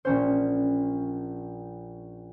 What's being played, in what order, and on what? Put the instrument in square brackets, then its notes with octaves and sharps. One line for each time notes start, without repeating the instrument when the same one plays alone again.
[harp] A#1 C#4 C5